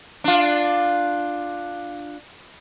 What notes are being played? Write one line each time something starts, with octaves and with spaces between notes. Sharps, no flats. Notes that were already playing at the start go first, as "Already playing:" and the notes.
D4 F4